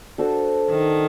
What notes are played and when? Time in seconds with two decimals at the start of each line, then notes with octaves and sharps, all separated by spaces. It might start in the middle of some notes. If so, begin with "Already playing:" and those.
0.18 D4 F#4 A4 C5
0.70 D#3